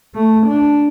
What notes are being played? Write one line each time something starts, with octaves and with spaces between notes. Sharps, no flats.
A3
D4